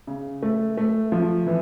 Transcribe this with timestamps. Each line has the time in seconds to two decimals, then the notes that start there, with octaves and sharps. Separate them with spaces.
0.07 C#3
0.42 A3
0.77 A3
1.12 F3
1.47 E3